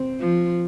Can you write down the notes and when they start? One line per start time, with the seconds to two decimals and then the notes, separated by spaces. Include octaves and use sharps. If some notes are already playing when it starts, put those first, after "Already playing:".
Already playing: C4
0.20 F3